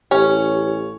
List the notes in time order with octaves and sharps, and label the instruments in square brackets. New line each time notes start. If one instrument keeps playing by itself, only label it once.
[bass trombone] A1 [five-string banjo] C#4 [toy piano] G4 [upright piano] C#5